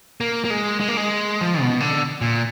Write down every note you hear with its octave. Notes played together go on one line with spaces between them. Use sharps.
A#3
A#3
G#3
G#3
A#3
G#3
F3
B2
D3
A#2